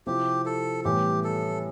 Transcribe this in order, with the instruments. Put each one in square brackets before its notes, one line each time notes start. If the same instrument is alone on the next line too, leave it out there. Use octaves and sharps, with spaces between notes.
[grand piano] C3 F3 C4 E4 [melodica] G4
[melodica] A4
[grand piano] A2 E3 G3 B3 [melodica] G4
[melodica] A4